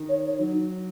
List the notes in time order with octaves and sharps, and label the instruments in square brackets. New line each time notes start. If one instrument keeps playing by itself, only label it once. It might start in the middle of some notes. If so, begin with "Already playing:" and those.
Already playing: [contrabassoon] D#3
[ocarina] C#5
C#5
[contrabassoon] F#3 [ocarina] D#4